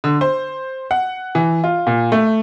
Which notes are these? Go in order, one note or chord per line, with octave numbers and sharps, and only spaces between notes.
D3
C5
F#5
E3
F4
A#2
A3